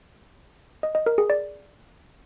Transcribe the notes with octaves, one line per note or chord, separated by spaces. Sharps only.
D#5
D#5
A#4
G#4
D5